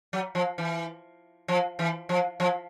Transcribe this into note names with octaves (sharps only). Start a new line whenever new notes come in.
F#3
F3
E3
F3
E3
F3
F3